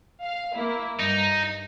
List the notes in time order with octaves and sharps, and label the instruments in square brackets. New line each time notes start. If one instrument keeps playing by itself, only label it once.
[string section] F5
A#3 E4
[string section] G2 [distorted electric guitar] D#4